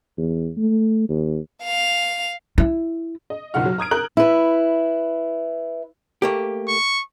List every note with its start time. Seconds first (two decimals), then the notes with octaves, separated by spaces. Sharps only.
0.18 E2
0.57 A3
1.09 D#2
1.63 F5 F7
2.58 E4
3.30 D#5
3.54 F#1 B1 F4 F#5 F6
3.66 F#3
3.78 A#5 D#6 G#6 D7
3.91 A#4 F#6 G6 F#7
4.17 E4 B4
6.22 A3 A#3 G4
6.68 C#6